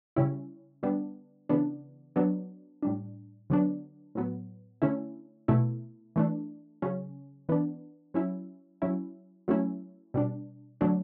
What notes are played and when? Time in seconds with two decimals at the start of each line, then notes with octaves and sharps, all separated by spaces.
0.16 C#3 G3 C#4 E4
0.83 D3 G3 B3 D4
1.49 C#3 E3 B3 D4
2.16 F#3 B3 D4
2.83 A2 G3 D4
3.50 D3 F#3 B3 D4
4.15 A2 F#3 B3
4.82 D3 A3 C#4 E4
5.48 B2 A3 E4
6.16 E3 A3 D4
6.82 C#3 F#3 C#4
7.49 E3 B3 D4
8.14 F#3 C#4 E4
8.82 F#3 C#4 E4
9.48 F#3 A3 C#4 E4
10.14 B2 G3 D4
10.81 D3 F#3 A3 D4